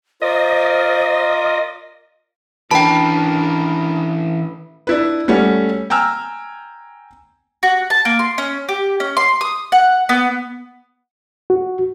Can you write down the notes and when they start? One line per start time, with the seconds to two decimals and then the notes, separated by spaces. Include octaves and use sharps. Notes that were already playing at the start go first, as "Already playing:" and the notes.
0.22 F4 A#4 C5 D5 D#5
2.71 E3 C#4 D4 A#4 B4 G5 A5
4.87 D4 E4 B4
5.28 G3 A3 C#4 F#4
5.90 G5 G#5 A#5 E6 F6
7.63 F#4
7.90 A5
8.05 A#3
8.19 C6
8.38 C#4
8.69 G4
9.00 C#4
9.17 C6
9.41 D#6
9.72 F#5
10.09 B3
11.50 F#4